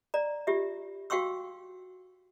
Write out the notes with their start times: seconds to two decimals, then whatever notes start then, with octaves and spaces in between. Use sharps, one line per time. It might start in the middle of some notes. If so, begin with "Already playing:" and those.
0.14 D5 A#5
0.47 F4 G4 E5
1.10 F#4 F5 G5 C6 C#6 E6